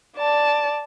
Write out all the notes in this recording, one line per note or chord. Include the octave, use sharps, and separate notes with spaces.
D5 A5